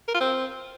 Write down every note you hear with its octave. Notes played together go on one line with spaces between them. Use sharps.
A#4
F4
C4